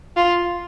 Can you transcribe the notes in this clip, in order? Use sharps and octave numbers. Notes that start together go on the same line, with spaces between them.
F4